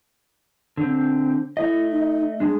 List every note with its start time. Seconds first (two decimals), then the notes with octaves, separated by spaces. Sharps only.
0.77 D3 C4
1.57 A3 E4 D#5
1.90 D#4
2.40 G#3 D4 G#4